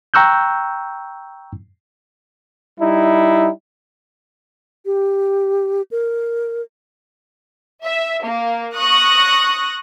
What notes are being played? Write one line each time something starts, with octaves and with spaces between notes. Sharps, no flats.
G5 A#5 C#6 E6 F#6 G6
G3 D#4 E4
G4
A#4
E5
A#3
C#6 D#6 F#6 A#6